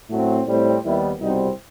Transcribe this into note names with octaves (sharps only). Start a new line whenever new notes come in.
A2 F#3 A3 C4
A2 G3 C4
D#2 D#3 G3 B3 E4
C2 B2 G3 C4 D#4